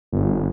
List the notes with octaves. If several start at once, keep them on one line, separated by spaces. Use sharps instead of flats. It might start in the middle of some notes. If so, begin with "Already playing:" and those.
G1